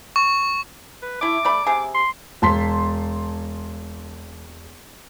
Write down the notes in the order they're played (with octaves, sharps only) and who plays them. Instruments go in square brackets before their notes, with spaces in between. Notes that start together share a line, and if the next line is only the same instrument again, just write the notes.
[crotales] C#6
[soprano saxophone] B4
[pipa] A3 E4 [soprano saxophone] D6
[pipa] A3 D5 B5
C3 G#4
[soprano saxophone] C6
[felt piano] E1 A5 C6 B6